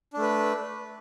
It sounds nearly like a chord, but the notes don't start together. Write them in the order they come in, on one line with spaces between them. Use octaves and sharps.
D4 A3 B4